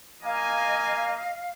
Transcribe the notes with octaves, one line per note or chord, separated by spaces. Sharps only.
A#3 D#5 F5 G#5